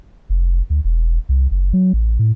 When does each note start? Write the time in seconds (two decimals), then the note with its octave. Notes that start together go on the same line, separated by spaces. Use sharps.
0.30 F1
0.70 D2
0.85 E1
1.29 C2
1.51 F#1
1.73 F#3
1.93 A1
2.19 A2